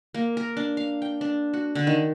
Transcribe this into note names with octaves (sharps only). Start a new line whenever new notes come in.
A#3
A#4
D4
F5
G5
D4
F#4
D3
D#3